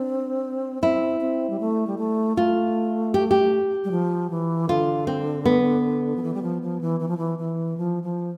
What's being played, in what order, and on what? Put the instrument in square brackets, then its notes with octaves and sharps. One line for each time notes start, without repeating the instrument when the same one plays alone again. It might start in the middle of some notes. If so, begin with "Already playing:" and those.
Already playing: [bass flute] C4 [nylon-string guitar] D4
[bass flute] C4 [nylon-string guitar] E4
[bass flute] C4
G3
A3
G3
A3
[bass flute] A3 [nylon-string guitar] F4
[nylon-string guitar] G4
G4
[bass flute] G3
F3
E3
[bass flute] D3 [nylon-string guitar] F4
[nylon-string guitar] C4
B3
[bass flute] F3
E3
G3
F3
F3
E3
E3
F3
E3
E3
F3
F3